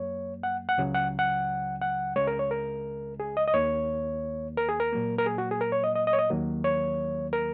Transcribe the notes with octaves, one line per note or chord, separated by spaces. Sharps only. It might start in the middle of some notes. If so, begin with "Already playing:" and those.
Already playing: F#2 F#3 A#3 C#5
F#5
F#5
C#2 C#3 F#3
F#5
F#5
F#5
C#2 C#3 G#3 C#5
A#4
C#5
A#4
G#4
D#5
D#5
D#2 D#3 A#3 C#5
A#4
G#4
A#4
A#2 F#3 A#3
A#4
G#4
F#4
G#4
A#4
C#5
D#5
D#5
D#5
C#5
D#5
D#2 D#3 F#3 A#3
C#5
A#4